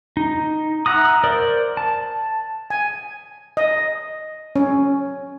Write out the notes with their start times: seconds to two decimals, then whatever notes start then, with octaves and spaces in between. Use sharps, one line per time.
0.17 D#4
0.86 E5 F#5 A#5 D#6
1.24 A#4 C5 D5
1.77 A5
2.70 G#5
3.57 D#5
4.56 C#4